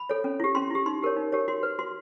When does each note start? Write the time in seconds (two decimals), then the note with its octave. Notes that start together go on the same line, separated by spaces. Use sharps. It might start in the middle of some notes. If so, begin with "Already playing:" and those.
Already playing: B5
0.09 A4 C#5
0.24 C#4
0.40 E4 G4
0.55 C#4 C6
0.71 E4 G4
0.86 D#4 C6
1.02 G4 A#4 C#5
1.17 D#4
1.32 G4 A#4 C#5
1.48 F#4 C6
1.63 B4
1.79 F#4 C6